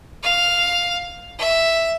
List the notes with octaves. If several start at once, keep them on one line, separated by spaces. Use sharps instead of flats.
F5
E5